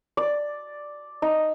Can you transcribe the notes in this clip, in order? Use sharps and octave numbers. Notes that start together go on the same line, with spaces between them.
D5
D#4